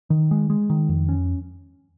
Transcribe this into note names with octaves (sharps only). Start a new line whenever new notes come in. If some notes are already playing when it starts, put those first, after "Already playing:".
D#3
G#3
G#3
D#3
F2
C#4